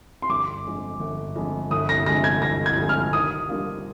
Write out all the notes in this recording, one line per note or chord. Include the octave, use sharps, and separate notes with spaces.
C6
G1 D6
F2 D3 G#3
G1
F2 D3 G#3
G1 D#6
A#6
F2 D3 G#3 A#6
G#6
G1 A#6
G#6
F2 D3 G#3
F6
D#3 D#6
G3 A#3 D4 F4